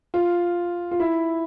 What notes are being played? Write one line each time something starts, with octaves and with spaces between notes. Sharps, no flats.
F4
F4
E4